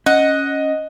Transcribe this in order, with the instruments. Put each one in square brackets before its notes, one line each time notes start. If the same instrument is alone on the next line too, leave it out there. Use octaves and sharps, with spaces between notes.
[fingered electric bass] C#4 [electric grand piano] D#5 [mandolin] F#5